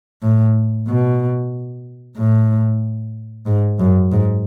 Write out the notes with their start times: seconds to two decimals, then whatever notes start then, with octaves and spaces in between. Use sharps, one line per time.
0.23 A2
0.88 B2
2.17 A2
3.46 G#2
3.79 F#2
4.12 G#2